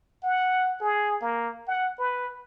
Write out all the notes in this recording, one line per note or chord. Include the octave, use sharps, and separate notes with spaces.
F#5
G#4
A#3
F#5
B4